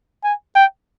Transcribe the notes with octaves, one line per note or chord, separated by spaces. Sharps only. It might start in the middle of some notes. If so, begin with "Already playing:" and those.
G#5
G5